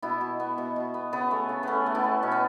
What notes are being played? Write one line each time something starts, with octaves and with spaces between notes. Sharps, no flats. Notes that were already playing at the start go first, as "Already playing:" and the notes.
B2 B3 E4
B2
B3
B2
B2
B3
C#3 B3
A3
C#3
A3 B3 C#4
A3
B3 E4
A3
B2 C#4
B3